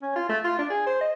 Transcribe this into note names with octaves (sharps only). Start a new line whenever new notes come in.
C#4
F4
A3
F4
D4
G#4
C5
D#5